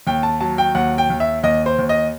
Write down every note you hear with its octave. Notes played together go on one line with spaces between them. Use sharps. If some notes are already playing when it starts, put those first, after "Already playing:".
D#2 G5
A5
F#3 A5
G5
D#2 F#5
G5
D#2
E5
D#2 D#5
C5
D#2
D#5